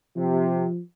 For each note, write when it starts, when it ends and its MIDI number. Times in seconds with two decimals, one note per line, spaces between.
0.16 0.64 48
0.16 0.80 53